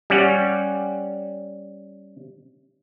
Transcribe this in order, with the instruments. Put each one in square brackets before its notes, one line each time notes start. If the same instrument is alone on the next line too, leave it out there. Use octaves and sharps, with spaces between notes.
[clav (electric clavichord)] G3 C#4 F#5